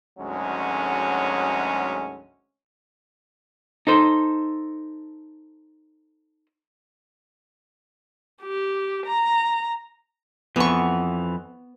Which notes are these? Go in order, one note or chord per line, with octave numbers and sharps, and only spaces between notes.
G#1 D2 F#3 G#3 C#4
D#4 A4 C5
G4
A#5
F2 E3 B3 C#6